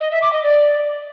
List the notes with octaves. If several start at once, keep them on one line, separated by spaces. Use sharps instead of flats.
D#5
E5
D6
D#5
D5